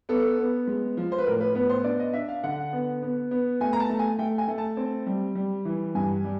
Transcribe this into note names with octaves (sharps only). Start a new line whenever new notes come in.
B3 A4
B3
G#3
F3
C5
B4
A2 A#4
B4
B3 B4
C5
D4 D5
D#5
D4 E5
F5
D3 F#5
B3
B3
B3
A3 G#5
A#5
A5
A3
G#5
A3 G5
G#5
A3
A5
C4
G3
G3
E3
G2 G#5
G3